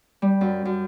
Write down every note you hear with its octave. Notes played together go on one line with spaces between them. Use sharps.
G3
F#2
F#2